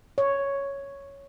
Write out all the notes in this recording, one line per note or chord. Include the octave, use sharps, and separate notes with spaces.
C#5